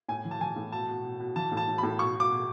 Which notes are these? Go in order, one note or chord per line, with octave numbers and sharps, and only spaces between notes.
A2 G#5
E3
A5
E3 G#5
A2
B2 A5
B2
B2
B2
E3 A5
A2
A5
A2
B5
A2
B2 C#6
B2 D6
B2